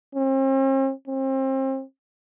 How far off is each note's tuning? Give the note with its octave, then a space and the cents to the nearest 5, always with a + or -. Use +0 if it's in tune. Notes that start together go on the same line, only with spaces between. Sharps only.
C4 +45
C4 +35